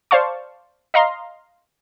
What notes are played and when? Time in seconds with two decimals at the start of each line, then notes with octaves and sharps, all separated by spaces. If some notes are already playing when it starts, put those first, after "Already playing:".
0.11 C5 D5 F5 A5 C#6
0.94 D#5 F5 A#5 C6